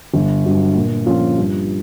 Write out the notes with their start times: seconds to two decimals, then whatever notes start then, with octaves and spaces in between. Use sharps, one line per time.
0.14 G1
0.44 G2 D3 F#3
0.75 A#2
1.06 F3 A#3 C#4 F4
1.37 G2